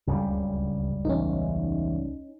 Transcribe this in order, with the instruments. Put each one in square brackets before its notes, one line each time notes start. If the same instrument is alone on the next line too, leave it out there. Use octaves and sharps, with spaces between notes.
[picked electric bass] D1 F#2 C#3 [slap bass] C#2 G3
[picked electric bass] A1 E2 [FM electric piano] C#4 D#4